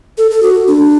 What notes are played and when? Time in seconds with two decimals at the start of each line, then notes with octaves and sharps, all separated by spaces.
0.18 A4
0.31 A4
0.43 F#4
0.68 D4